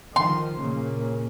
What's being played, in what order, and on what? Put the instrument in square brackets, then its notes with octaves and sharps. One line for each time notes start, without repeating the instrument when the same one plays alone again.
[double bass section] D#3 F3 [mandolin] C6
[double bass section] A#2 C#3 A#3